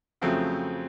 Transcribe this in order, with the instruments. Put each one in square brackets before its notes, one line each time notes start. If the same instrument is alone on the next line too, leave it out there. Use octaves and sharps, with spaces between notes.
[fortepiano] F2 C#3 F#3 A3 C4